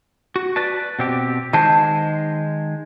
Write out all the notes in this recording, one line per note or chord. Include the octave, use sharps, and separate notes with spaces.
F#4
B4 D5 A5
B2 C4 G4
D#3 G#3 C5 A5